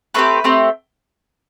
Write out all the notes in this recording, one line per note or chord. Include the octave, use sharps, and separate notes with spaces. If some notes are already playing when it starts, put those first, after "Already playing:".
A3 C4 G4 B4
A3 C4 G4